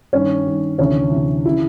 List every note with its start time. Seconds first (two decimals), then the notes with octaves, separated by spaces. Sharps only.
0.13 G2 D#3 C#4
0.47 G2 D#3
0.79 D2 C3 E3 C#4
1.11 D2 C3 E3
1.45 C#3 E3 E4